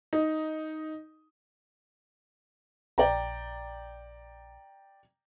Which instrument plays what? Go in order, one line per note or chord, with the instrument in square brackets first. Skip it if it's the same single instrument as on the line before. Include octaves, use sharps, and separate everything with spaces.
[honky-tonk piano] D#4
[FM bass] A#1 [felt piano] D5 G5 A#5